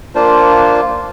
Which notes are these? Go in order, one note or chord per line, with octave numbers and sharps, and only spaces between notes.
A#3 D4 F4 C5